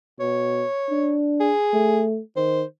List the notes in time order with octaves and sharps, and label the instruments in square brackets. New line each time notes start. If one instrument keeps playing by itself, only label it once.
[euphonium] B2 [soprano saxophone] C#5
[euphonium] D4
[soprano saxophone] G#4
[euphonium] A3
[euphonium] D#3 [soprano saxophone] C5